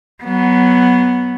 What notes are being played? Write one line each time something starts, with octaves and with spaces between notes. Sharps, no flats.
F#3 B3